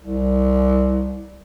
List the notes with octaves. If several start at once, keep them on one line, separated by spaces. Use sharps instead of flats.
C2